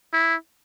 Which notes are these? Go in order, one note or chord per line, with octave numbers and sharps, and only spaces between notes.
E4